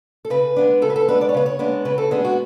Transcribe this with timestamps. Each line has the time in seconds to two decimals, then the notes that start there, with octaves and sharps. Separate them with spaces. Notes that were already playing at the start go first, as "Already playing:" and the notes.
0.25 A4
0.30 C#3 B4
0.56 G#3 B3 D4
0.82 C#3 A4
0.90 B4
0.96 A4
1.08 G#3 B3 D4 B4
1.21 D5
1.29 C#5
1.34 C#3 B4
1.46 C#5
1.59 G#3 B3 D4
1.85 C#3 B4
1.98 A4
2.11 G#3 B3 D4 G#4
2.25 F#4